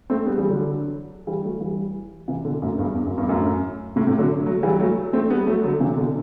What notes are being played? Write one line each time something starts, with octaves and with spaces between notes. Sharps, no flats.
A3 C4
G3 B3
E3 G3
D3 F#3
E3 G3
F#3 A3
E3 G3
C3 E3
B2 D3
F#2 A2
E2 G2
E2
F#2
E2 G2
F#2 A2
A2 C3
A2 C3
D3 F#3
F#3 A3
E3 G3
F#3 A3
A3 C4
G3 B3
F#3 A3
D3 F#3
C3 E3
B2 D3